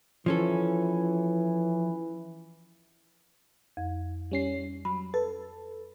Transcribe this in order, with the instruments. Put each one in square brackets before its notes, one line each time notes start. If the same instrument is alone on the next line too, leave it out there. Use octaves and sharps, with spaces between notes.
[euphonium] E3 [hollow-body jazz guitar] F3 C#4 A4
[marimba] F2
[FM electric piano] G3 C#4 C7
[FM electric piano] F#3 [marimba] B5
[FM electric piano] A4 [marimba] B4